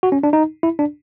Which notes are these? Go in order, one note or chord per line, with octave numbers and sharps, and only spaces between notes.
F#4
C#4
D4
D#4
E4
D4